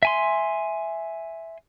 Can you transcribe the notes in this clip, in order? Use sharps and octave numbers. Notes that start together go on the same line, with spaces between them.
E5 G#5 C6